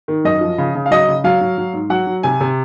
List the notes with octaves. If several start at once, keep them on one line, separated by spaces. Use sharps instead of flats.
D#3
F#2 D#5
F3
C#3
C#3
F5
F#3 D#5
C#3
F#3 F5
F#3
F#3
G#2
F#3 F#5
F#3
C3 G#5
C3